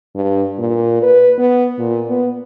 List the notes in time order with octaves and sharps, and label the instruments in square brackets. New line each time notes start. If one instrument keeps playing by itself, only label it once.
[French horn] G2
A#2
B4
B3
A#2
B3